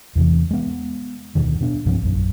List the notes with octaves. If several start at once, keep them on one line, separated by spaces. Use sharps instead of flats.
E2 C3 E3
G#3 B3
D1 C2 B2 D#3
B2 B3 D4
C2 G2 F3 C4
A#1 F#2